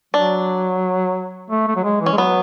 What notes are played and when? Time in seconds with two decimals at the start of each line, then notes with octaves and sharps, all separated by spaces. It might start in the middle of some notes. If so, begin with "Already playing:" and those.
0.14 F#3 D4
1.50 A3
1.68 A3
1.76 F#3
1.84 G#3
2.01 E3
2.06 C#4
2.13 G#3
2.18 F#3 B3